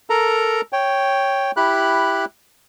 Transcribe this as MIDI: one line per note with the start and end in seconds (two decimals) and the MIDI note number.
0.10 0.61 69
0.10 0.61 70
0.10 0.61 82
0.73 1.51 73
0.73 1.51 79
1.57 2.25 64
1.57 2.25 67
1.57 2.25 83
1.57 2.25 90